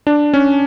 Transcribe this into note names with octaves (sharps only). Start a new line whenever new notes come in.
D4
C#4